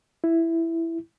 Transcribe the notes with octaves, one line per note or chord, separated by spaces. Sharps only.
E4